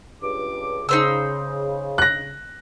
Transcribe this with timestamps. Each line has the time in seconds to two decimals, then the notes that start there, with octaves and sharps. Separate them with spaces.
0.22 C#2 G2 D6
0.89 C#3 D#4 C5 E6
1.98 F#6 A#6